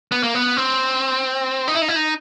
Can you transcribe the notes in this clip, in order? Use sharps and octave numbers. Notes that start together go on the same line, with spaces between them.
B3
A#3
B3
C4
D#4
E4
D#4
E4
D#4